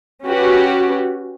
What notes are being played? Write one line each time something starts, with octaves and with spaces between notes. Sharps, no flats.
C#4 F#4 G4 B4